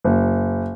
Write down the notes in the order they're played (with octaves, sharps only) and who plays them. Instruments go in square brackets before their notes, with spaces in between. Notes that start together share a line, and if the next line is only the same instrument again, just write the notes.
[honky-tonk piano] F#1